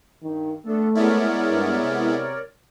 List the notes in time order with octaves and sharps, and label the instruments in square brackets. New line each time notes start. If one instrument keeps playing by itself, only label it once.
[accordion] G2 [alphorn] D#3
[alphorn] A3 [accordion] B3 D4 A4
[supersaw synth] G#3 B3 E4 [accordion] A#4 C#5 D5
[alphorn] G2
C3